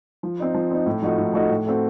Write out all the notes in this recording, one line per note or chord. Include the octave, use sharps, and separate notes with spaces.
F3
C4 D#4
F3
C4 D#4
A2
F3 A3 D#4 F#4
A2
F3 A3 D#4 F#4
A2
A3 C4 F#4